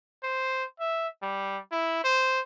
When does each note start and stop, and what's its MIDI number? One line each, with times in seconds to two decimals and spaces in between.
0.23 0.64 72
0.80 1.07 76
1.22 1.59 55
1.72 2.04 64
2.04 2.40 72